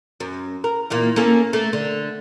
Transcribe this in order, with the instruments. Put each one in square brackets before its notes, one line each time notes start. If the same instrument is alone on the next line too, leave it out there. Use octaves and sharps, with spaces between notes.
[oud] F#2
A#4
E2 A#2 A#3
A#3 C#4 A4
A3 A#3
D3